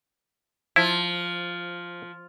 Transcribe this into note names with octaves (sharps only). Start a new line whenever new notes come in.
F3 E4